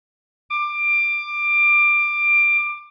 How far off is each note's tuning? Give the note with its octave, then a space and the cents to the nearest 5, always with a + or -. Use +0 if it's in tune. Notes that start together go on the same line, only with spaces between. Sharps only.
D6 +20